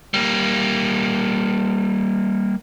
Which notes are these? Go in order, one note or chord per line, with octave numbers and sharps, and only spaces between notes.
G3 A#3